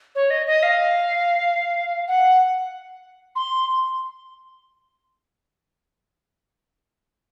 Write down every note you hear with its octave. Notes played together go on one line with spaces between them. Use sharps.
C#5
D#5
D#5
F5
F#5
C6